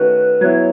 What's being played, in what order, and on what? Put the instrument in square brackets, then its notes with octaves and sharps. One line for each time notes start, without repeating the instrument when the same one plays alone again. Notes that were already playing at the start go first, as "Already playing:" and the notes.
Already playing: [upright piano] D#3 A3 C#4 F#4 [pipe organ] B4
[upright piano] F#3 B3 E4 [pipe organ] C#5